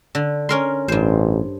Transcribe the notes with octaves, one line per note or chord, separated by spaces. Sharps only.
D3
C#4 A#4 C6
A1 G2 C5